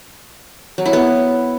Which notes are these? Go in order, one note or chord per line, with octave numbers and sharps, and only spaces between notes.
F#3
E4
B3